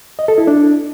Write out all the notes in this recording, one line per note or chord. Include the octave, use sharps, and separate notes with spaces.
D#5
A4
E4
D4